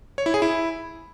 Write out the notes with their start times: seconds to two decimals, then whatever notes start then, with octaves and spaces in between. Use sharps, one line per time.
0.18 C#5
0.26 E4
0.34 G#4
0.42 E4